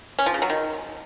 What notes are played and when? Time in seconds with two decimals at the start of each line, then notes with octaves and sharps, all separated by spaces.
0.19 C#4
0.26 F3
0.34 C#3
0.42 F#3
0.50 D#3